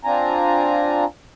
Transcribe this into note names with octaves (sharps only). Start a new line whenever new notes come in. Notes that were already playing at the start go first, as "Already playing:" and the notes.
C4 D4 F4 G#5 A#5